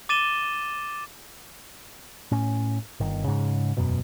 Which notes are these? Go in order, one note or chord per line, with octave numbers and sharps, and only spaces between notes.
D6 A6 D#7 E7 G7
A2 C#4
G1 D#3
G#2 C#3
E1 F#2 B2